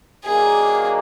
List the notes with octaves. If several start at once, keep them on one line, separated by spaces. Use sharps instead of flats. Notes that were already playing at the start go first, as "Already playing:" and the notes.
D#3 F#3 A#3 D4 G#4